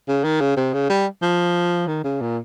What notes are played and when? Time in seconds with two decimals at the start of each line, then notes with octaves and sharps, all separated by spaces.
0.08 C#3
0.24 D#3
0.41 C#3
0.57 C3
0.74 C#3
0.90 G3
1.22 F3
1.87 D#3
2.04 C#3
2.21 A#2